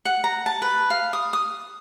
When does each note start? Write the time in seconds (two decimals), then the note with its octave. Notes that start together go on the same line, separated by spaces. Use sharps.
0.05 F#5
0.24 A#5
0.46 A5
0.62 B4
0.90 F5
1.13 D#6
1.33 D#6